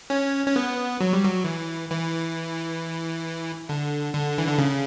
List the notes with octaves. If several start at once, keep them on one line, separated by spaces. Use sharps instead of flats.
C#4
C#4
B3
F#3
G3
F#3
E3
E3
D3
D3
E3
D3
C#3